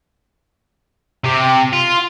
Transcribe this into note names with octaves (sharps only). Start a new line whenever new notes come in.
C3 G4
F4